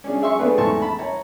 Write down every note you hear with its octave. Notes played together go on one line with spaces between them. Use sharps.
C#4 D4 G#4
G#4 E5 C6 C#6
A3 B3 C4 D4 G#4 B4
E2 G#2 A3 A5 C6 C#6
A5 B5
C#5 A#5